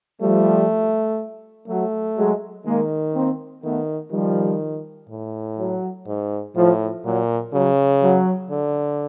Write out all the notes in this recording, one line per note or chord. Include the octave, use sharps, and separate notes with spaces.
F3 G3 A3
F#3 A3
F#3 G#3
D#3 G#3 A#3
A#3 C4
D#3 A3 B3
D#3 F3 G3
A2
F#3
G#2
A2 F3
A#2 F#3
C#3 F#3
F#3
D3